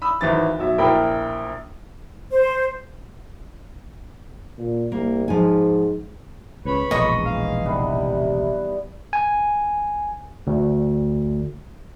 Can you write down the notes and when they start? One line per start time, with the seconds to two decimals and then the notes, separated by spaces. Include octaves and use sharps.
0.02 B5 D#6 E6
0.21 G#1 E3 A6
0.59 B1 F#3 E5
0.78 A#1 E4 A#4 G5 B5
2.32 C5
4.58 A#2
4.92 C2 A#3
5.28 G#2 F3 G#5
6.65 C#2 B4 C#5 B5
6.91 E1 A#1 G#2 D#5 C#6
7.25 E3 F5
7.65 C3 E3 G3 B3
9.13 G#5
10.47 D2